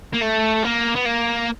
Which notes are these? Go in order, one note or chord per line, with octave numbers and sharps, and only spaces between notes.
A#3
A3
A#3
B3
A#3